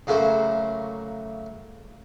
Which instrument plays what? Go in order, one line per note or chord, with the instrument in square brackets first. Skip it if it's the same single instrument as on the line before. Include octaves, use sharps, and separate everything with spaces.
[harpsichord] C#3 F#3 A3 A#3 C5